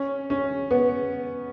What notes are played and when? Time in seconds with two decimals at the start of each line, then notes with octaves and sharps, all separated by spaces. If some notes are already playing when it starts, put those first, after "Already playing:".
Already playing: C#4
0.30 C#4
0.71 B3